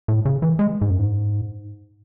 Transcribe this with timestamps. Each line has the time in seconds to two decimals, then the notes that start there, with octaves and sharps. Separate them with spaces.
0.08 A2
0.25 C#3
0.42 E3
0.59 G#3
0.81 G#2
0.90 F#2
0.99 G#2